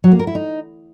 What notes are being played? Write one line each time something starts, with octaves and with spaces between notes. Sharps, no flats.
F#3
A#3
A#4
E4
D#4